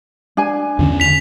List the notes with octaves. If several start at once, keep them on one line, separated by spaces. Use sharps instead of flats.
D4 G#5
E2 D3 C#4
B6 F7